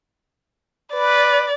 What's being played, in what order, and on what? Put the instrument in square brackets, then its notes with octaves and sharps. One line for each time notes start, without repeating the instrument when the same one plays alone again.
[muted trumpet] B4 [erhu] D5